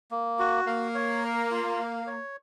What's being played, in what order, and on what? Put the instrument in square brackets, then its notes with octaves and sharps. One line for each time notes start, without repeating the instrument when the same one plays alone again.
[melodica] A#3
F#4
[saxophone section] A#3 [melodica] F5
[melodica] C#5
A#4
F4
F5
C#5